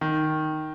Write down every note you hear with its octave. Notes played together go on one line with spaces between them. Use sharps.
D#3